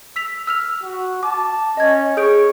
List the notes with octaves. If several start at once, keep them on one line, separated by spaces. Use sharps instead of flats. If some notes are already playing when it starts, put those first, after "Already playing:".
E6 B6 F7
E6 F6 F7
F#4
A5 D6
C#4 D#5 G#6
G#4 C#5 G6 D7